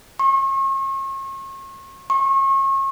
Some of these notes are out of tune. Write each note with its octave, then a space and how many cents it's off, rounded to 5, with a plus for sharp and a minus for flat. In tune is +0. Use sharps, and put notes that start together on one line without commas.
C#6 -40
C#6 -35